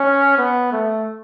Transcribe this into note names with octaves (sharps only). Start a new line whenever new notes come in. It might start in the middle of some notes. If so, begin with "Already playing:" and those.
Already playing: C#4
B3
A3